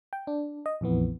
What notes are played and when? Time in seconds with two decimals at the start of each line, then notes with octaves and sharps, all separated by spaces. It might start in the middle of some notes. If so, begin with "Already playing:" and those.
0.13 G5
0.27 D4
0.66 D#5
0.81 A#1 F2 E3 B3